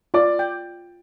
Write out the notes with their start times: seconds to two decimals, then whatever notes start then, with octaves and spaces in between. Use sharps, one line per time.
0.14 F4 D5
0.39 G5